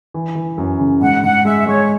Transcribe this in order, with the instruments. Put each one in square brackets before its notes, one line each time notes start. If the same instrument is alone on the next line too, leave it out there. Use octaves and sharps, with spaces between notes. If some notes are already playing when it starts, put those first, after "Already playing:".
[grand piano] E3
E3
F#2
C#3
[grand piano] G#2 [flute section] F#5
[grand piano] G#2 [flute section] F#5
[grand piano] G#3 [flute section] E5
[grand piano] G#3 [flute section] C#5